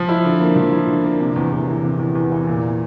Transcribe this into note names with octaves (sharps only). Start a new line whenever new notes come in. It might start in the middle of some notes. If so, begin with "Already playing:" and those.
Already playing: F3
E4
D3
A#3
F3
E4
D3
A#3
C3
E2
E2
E3
C3
E2
E2
E3
A#2